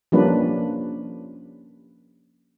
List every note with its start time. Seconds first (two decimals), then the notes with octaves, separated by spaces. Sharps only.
0.12 F3 G3 A#3 C#4 D4 B4